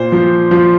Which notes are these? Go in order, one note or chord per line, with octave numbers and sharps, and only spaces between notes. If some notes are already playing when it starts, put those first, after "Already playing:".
Already playing: A#2 C5
F3
F3